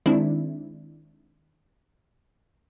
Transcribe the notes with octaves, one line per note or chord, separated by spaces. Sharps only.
D#3 G#3 C4 D4 E4